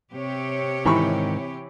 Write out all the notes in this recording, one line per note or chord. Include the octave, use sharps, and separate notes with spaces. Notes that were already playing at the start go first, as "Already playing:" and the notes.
C3 G4 C#5
G#2 D#3 E3 B5 C#6